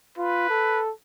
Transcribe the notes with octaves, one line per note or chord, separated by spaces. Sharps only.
F4 B4
A4